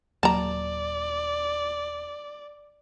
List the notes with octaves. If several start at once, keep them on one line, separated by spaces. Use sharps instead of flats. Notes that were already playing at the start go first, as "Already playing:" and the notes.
D#1 F#3 A#3 D5 A5 A#5